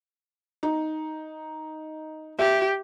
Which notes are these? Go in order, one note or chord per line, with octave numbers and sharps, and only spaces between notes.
D#4
G4 E5